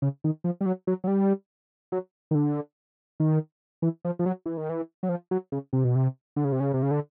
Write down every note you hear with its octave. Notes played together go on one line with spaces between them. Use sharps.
C#3
D#3
F3
G3
F#3
F#3
F#3
G3
F#3
D#3
D3
D#3
E3
F3
F3
F#3
E3
D#3
E3
F#3
F3
F#3
C#3
C3
B2
C3
D3
C#3
C3
C#3
C3
C#3
D3